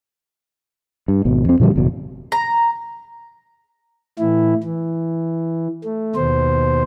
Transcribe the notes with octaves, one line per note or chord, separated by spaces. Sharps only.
G2
G#1 B2
F2 C4
A#2 D3 F3 G3
F#1 E2 B2
A#5
A2 E3 E4
E3
A3
D#2 B2 C5